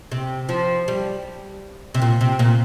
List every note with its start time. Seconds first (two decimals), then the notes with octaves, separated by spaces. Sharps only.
0.12 C3
0.49 F3
0.88 G3
1.94 C3
2.02 A#2
2.21 C3
2.39 A#2